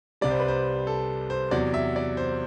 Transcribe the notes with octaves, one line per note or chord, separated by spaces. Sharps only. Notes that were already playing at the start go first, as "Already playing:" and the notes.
C2 C3 G3 D5
C5
B4
C5
A4
C5
E2 C3 F#3 D5
E5
D5
C5